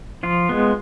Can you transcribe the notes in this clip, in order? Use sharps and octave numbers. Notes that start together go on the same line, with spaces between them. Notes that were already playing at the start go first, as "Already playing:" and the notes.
F3 F4
G#3 B3